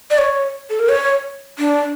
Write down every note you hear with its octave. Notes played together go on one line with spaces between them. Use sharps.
D5
C#5
A4
A#4
C#5
D4